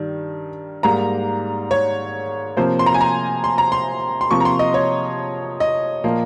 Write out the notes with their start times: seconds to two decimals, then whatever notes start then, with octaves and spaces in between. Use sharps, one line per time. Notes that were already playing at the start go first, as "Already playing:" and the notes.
Already playing: G2 D#3 G3
0.83 G#2 G3 A#3 A#5
1.71 C#5
2.57 C3 F3 A#3 C5
2.79 C6
2.86 A#5
2.94 G#5
3.01 A#5
3.44 C6
3.58 A#5
3.72 C6
4.21 C6
4.31 C3 F3 A#3 C#6
4.40 A#5
4.45 C6
4.59 D#5
4.74 C#5
5.60 D#5
6.04 A#2 F3 A#3